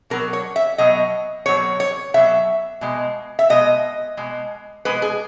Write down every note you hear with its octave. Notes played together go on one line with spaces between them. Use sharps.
B2 F#3 A#4
C#5
E5
B2 F#3 D#5
B2 F#3 C#5
C#5
B2 F#3 E5
B2 G#3
E5
B2 G#3 D#5
B2 G#3
B2 G#3 B4
G#4